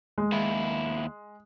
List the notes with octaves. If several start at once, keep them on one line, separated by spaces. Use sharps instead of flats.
G#3
D#2 E4